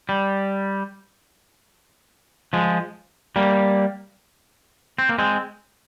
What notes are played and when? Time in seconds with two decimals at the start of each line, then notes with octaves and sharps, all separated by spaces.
0.09 G3
2.53 F3 G#3
3.36 G3 A#3
4.98 C4
5.09 A#3
5.19 G#3 C4